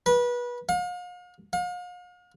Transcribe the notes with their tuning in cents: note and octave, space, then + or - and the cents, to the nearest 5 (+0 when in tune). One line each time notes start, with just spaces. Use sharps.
B4 -25
F5 +40
F5 +40